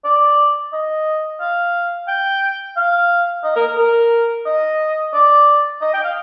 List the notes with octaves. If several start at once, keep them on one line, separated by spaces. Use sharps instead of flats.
D5
D#5
F5
G5
F5
D#5
A#4
A#4
A#4
D#5
D5
D#5
G5
F5